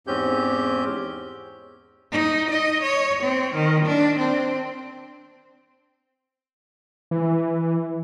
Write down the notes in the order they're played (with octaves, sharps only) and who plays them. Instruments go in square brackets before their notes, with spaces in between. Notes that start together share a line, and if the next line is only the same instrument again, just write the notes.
[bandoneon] E2 G#2 C4 C#4 G4 G6
[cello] D#4
D#5
C#5
C4
D#3
D4
C4
[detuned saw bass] E3